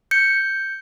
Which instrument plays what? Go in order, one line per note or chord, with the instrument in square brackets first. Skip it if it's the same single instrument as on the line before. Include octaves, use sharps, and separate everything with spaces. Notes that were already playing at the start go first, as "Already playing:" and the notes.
[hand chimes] G6 C#7